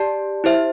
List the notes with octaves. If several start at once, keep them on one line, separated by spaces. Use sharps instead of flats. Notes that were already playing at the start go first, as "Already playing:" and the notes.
Already playing: G4 D5 A5
E4 G4 C5 E5